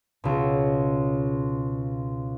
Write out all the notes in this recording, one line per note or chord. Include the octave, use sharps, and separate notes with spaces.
C#2 B2